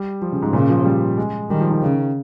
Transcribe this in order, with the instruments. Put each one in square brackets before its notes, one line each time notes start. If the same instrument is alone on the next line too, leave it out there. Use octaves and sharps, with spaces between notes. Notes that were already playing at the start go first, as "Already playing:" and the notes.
Already playing: [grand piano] G3
F3
C#3
G#2
[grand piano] A#2 [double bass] C#3
[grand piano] F3
G3
G#3
[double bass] D#3 [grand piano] G3
[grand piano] F3
D#3
[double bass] C#3